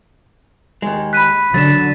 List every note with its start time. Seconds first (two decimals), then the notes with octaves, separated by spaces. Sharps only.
0.82 D#2 G#3
1.13 B5 F#6 B6 D#7
1.54 D3 F#3 A6 B6 E7